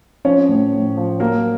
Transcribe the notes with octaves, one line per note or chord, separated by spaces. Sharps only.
F3 C#4 C#5
A2
A2
F3
F#3 A#3 A#4